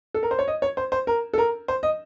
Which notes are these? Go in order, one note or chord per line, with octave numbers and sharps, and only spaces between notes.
A4
A#4
C5
C#5
D#5
C#5
C5
C5
A#4
A4
A#4
C5
D#5